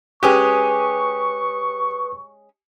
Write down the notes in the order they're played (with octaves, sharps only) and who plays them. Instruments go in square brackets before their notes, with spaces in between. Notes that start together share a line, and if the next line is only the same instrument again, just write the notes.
[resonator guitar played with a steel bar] G#3 C#4 G#4 [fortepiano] G4 [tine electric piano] B4 D#6 F#6 [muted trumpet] C#6